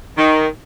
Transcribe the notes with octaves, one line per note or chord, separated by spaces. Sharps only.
D#3